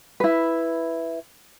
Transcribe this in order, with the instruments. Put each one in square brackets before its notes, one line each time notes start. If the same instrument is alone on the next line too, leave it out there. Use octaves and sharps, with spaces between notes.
[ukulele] E4 B4